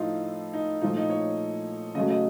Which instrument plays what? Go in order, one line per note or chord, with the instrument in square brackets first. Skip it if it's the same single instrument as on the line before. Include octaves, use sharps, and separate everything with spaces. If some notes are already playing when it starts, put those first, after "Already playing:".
Already playing: [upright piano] A2 F3 A3 D#4 F4
D#4
A#2 F3 A3 D#4
D#4
C#5
C#3 F#3 A3 D#5
D#5